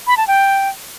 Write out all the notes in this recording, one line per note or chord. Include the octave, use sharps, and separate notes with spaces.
B5
A5
G5